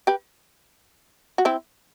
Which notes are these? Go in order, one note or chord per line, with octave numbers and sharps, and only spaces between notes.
G4 B4
F#4
C4 E4